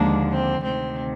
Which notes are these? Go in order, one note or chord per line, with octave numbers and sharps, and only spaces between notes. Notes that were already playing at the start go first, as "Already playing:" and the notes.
Already playing: D#2 D3 F3 G#3 A#3 D4
C4
D2 C3 D#3 C4